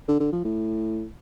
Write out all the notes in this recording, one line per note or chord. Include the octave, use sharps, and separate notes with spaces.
D3
D3
F3
A2